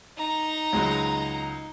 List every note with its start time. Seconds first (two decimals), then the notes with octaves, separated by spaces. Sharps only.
0.17 D#4 A#5
0.73 C#2 F#3 G#3